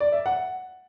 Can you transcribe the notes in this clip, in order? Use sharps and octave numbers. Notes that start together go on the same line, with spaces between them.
D5
E5
F#5